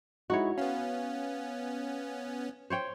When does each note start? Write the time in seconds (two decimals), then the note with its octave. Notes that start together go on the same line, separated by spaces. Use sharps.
0.30 G#3 D#4 E4 F#4 C#5
0.58 B3 C#4 F5
2.70 C5 C#5 G5